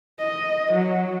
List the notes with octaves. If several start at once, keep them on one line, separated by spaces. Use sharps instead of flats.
D#5
F#3